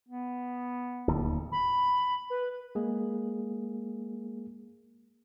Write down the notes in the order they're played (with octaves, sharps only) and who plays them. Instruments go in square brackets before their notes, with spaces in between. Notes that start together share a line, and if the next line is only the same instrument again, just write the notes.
[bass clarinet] B3
[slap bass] D1 D#2
[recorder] B5
B4
[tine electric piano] G#3 A#3 G#4